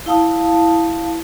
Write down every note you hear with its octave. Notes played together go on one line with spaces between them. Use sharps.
E4 F5 A5 D#6